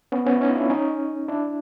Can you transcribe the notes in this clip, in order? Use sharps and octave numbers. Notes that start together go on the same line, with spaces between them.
B3 C#4
B3 C#4
E4
C#4 D#4
F4
D4 E4
C#4 D#4
D4 E4